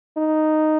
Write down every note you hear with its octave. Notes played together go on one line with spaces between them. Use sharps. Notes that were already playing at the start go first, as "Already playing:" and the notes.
D#4